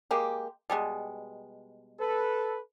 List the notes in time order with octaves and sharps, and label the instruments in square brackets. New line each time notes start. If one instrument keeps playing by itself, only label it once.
[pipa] G#3 A#3 G4
B2 G3 G#3
[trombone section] A4 B4